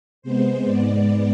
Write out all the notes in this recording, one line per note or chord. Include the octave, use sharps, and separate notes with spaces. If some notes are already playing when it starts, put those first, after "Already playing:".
C3 G#3 B3 C5
G#2 G#3 B3 D5